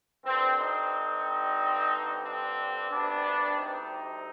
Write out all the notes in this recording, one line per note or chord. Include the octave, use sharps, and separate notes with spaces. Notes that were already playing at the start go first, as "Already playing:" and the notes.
G2 D3 G3 C4
C4 D#4
C4
D2 C3 G3 B3 D4
C4 D#4